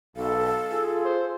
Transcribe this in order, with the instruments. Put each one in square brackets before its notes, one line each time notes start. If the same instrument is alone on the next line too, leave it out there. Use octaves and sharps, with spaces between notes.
[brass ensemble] B1 [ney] A4 [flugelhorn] F5
[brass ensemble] F4 G#4
[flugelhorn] C5